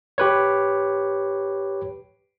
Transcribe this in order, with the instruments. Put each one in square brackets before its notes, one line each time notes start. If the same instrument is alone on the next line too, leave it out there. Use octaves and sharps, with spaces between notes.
[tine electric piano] G4 B4 C#5